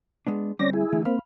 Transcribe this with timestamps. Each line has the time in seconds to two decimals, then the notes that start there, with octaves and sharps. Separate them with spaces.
0.27 G#3 B3 D4
0.59 D2 G3 C4 C#4 D5 A#6
0.73 E4 G#4
0.93 D3 E3 A3
1.05 A#3 C4 F5 B5